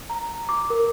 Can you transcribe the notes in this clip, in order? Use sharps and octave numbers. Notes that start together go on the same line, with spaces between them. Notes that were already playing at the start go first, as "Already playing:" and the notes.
A#5
D6
A#4